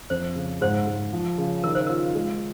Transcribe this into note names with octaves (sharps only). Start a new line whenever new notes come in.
F2 C5
C#3
G#2 C5
G#2
F3
C#3
D#3 A#4
C5
F4 A#4
G#3